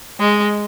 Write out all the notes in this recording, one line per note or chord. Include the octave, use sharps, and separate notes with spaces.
G#3